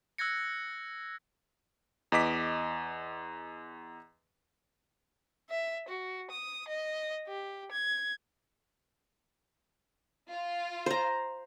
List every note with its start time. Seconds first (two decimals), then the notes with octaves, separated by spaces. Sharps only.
0.18 E6 F#6 G#6 A#6 C#7
2.12 E2 D#5 D6 B6
5.50 E5
5.88 F#4
6.31 D#6
6.68 D#5
7.28 G4
7.71 G#6
10.30 F4
10.86 C5 A#5